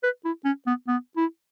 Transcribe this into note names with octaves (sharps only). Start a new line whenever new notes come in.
B4
E4
C#4
B3
B3
E4